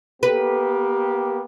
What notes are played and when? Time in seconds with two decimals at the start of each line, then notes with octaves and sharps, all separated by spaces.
0.23 A#3 B3 G4 B4